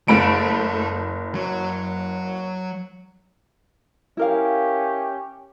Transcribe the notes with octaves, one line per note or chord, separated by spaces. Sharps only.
F#1 A3 B5 D7
F#3 C#5
C#4 E4 G4 A#4 F5